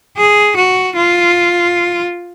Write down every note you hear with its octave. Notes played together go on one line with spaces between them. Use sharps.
G#4
F#4
F4